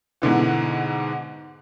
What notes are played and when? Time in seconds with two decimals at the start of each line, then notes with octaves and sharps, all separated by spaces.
0.22 G#2 B2 D3 E3